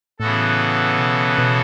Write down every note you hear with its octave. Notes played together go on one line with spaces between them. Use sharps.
A2 C#3 E3 B3 F#4 A4
B2
B2